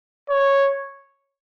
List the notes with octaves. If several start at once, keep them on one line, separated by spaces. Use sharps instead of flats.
C#5